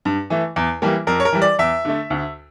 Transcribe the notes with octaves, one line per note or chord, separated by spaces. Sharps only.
G2
E3 A3
E2
E3 G3 A#3
F2 A#4
C#5
A#4
E3 G3
D5
E2 E5
D3 A3
D2